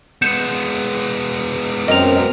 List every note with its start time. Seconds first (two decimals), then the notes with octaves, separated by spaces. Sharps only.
0.22 G#3 B3 G6 C#7 E7
1.88 F#2 C4 A#4 D#5 F7